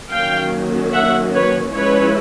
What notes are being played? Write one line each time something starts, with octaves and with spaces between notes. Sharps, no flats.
D#3 F#3 A#3 C#4 F5 G5
E5 F#5
B4 C#5
F3 G#3 C#4 E4 B4 C#5